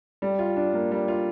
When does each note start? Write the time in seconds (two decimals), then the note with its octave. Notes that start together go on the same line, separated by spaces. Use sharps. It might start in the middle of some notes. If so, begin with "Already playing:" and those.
0.22 G3
0.39 F4
0.56 D4
0.73 A#3
0.91 G3
1.08 F4